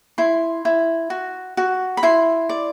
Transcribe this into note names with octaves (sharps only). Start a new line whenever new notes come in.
E4 C6
E4
F#4
F#4
B5
E4 C6
D5